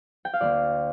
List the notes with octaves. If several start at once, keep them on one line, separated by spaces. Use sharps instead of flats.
G5
F5
D2 D3 A#3 D5